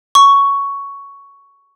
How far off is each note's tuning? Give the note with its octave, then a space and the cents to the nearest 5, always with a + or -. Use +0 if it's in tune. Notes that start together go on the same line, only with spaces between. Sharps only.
C#6 +10